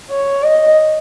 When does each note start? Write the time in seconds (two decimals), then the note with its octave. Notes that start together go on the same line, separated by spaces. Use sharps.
0.10 C#5
0.43 D#5